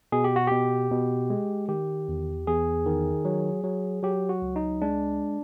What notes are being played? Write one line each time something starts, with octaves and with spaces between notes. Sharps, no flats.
B2 G#4
G4
F#4
B2 G4
B2
G#3
D#3 G4
E2
E2 G#4
D#3
F#3
F#3
F#3 G4
F#4
C#2
D#4
G#3 D4